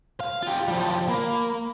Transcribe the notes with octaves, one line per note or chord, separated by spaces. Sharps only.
F5
F4 G4
F3 G3
A#3 B5